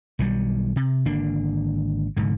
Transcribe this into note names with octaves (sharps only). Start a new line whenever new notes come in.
B1 D#3 F#3 G3
C3
G#1 D3 A#3 D4
F1 G#2 D3